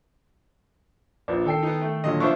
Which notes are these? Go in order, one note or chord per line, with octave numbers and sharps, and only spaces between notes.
A#1 F4 B4 D5
D#3 A4 G5 C7
B3 D#4
A3
A#2 D3 F#3 D#5
F3 B3 D4 C5 E5 C#6